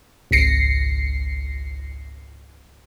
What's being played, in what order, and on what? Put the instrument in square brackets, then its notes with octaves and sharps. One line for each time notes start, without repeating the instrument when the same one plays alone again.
[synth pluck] G#1 C#2 A#6 C7 C#7